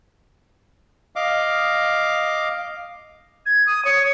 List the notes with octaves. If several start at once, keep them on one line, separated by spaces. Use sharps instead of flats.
D#5 F5 D6
G#6
D#6
C#5